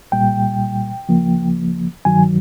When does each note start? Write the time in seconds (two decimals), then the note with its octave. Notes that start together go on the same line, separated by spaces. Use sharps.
0.12 C2 A#2 G3 G5
1.09 D2 C#3 F3 A#3
2.05 G2 D#3 F#3 G#5